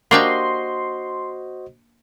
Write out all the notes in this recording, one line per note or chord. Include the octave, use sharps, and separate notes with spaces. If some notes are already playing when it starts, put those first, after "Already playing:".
A#3 D4 F#4 G4 C5 D#5 C6